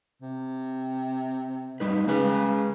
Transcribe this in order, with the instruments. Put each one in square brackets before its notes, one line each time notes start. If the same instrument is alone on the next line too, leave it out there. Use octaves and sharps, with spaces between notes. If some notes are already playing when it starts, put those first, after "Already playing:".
[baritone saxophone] C3
[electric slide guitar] G3 D#4 B4
[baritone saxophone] C#3 [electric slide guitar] G#3 B4